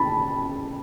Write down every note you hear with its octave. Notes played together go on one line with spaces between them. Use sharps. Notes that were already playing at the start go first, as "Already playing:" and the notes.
Already playing: A5 B5